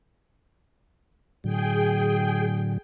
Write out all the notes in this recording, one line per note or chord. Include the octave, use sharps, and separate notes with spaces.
A2 D3 F#3 G#4 G5